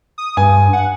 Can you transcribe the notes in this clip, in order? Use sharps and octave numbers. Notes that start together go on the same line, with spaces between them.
D#6
G2 G#5
F#5